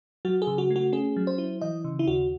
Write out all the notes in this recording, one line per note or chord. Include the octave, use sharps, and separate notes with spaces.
F#3 F#4
G#4
C#3
F#4
A3
F#4
C#4 G#4
F#3
C5
E4
E3 D#5
C#3
E4
D#2 F#4